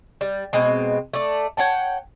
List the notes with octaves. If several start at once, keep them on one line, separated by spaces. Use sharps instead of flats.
G3
B2 G#3 C4
A3 D5
C#5 F#5 G5 A5